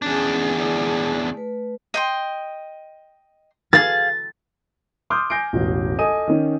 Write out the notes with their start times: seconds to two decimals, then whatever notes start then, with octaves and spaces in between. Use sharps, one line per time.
0.02 E2 C#4 D4 G#4 G#5
0.56 E4 D5
1.34 A3 B4
1.94 D#5 G5 C6
3.73 G#4 F5 A6
5.10 C6 D6 D#6 F6 G6
5.30 G#5 G6 A#6 C7 D7
5.53 E1 A1
5.99 A4 D#5 G#5 D#6 D#7
6.28 D#3 C#4